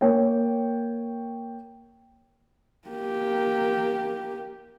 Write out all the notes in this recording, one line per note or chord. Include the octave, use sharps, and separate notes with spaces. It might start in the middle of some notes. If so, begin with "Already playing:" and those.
A#3 C#5 G5
A#3 G4